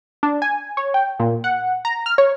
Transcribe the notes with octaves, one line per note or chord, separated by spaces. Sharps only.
D4
G#5
C#5
G5
A#2
F#5
A#5
F6
C#5